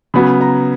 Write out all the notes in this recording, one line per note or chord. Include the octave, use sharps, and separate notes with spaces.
C#3 F#3 B3 B5
A#5